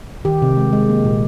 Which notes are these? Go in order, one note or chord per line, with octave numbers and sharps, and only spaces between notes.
D#3 G4
C3
G#3
G#3
A#3
A#2